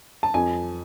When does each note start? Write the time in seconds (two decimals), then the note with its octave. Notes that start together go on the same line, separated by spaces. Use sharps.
0.23 A5
0.34 F2 G#5